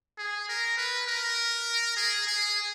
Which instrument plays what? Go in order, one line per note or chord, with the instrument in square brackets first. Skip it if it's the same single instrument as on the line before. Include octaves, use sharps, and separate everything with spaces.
[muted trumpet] G#4
A#4
B4
A#4
G#4
G#4